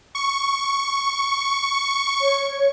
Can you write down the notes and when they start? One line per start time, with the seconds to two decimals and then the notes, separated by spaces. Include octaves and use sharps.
0.15 C#6
2.21 C#5